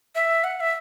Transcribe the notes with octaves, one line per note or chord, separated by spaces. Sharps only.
E5
F#5
E5